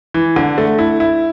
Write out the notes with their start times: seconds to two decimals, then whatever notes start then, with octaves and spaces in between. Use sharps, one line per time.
0.14 E3
0.36 D3
0.58 A3
0.79 E4
1.00 E4